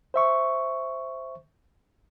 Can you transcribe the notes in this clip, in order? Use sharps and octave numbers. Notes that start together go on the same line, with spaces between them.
C5 E5 C#6